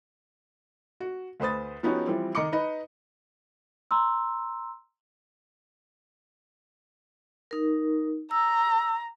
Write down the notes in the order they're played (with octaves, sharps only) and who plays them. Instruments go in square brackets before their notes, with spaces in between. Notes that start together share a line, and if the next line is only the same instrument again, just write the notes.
[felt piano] F#4
D2 B4 C5 D#6 A6
F3 B3 C#4 D#4 F#4 G4
E3 F3 G3 C4
D#3 D#5 A#5 D6 C#7
D#4 B4 D#5
[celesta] A#5 C6 E6
[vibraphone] D#4 A#4
[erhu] A#5 [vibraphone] E6